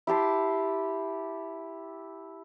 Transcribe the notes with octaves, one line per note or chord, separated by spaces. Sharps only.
E4 G4 A5 C6